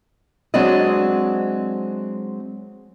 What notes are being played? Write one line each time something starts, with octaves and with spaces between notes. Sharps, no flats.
F#3 G#3 C4 D4 D5 D#5